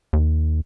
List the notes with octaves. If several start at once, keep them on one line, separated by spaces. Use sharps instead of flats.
D#2